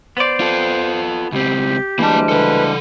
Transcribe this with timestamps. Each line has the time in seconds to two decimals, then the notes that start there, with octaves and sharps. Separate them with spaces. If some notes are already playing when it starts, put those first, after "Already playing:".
0.17 B3 C5 D5
0.40 F4 A4
1.32 C#2 C4 G4
1.99 D2 E3 G3 G#3 A#3 D4 A5
2.29 C#3 A4 B4